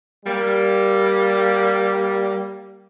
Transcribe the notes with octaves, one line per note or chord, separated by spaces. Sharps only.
G3 A#3